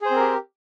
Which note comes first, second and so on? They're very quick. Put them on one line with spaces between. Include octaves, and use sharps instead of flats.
G#4 C5 C4 A#4 G4